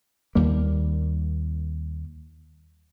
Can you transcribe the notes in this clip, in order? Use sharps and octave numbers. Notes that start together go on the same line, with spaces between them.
D#2 G3 A#3